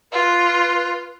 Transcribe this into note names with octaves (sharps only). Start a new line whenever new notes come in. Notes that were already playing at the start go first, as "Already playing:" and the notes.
F4 B4